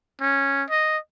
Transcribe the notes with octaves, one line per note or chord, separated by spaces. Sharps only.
C#4
D#5